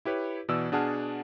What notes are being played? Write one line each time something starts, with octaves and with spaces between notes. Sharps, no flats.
E4 G4 B4 C#5
B2 E3 D5 E6
B2 D4 G#4 F#5 A5 F6